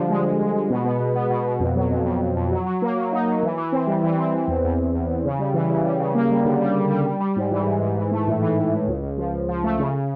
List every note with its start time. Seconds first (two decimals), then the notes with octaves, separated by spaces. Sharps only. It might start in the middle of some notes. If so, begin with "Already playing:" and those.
Already playing: D3 F3 G3
0.10 G#3
0.25 G#3
0.39 G#3
0.54 G#3
0.70 B2
0.85 B3
1.00 B2
1.15 B3
1.30 B2
1.46 B2
1.60 F2
1.76 F#3
1.91 F2
2.06 F2
2.21 F2
2.36 F2
2.52 F#3
2.66 F#3
2.82 A#3
2.97 F#3
3.12 D#4
3.28 F#3
3.43 E3
3.58 E3
3.72 C4
3.87 G3
4.03 E3
4.18 C4
4.34 E3
4.48 E2
4.64 E2
4.79 E2
4.94 E2
5.09 E2
5.25 C#3
5.39 G3
5.54 E3
5.70 C#3
5.84 G3
6.00 C#3
6.15 A#3
6.31 G3
6.45 D3
6.61 G3
6.76 G3
6.90 G3
7.06 G3
7.20 G3
7.36 G#2
7.51 E3
7.66 G#2
7.82 G#2
7.97 E3
8.11 A3
8.28 A2
8.42 E3
8.58 A2
8.72 A2
8.88 C#2
9.02 C#2
9.18 F3
9.33 C#2
9.49 F3
9.64 A3
9.79 C#3
9.94 C#3